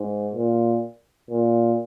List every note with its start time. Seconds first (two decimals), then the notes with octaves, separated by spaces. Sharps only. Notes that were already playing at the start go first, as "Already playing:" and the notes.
Already playing: G#2
0.34 A#2
1.31 A#2